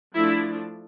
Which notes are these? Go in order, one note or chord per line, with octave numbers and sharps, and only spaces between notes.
F3 A3 D4 E4